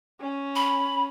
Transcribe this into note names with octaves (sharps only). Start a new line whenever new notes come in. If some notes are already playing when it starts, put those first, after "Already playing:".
C#4
B5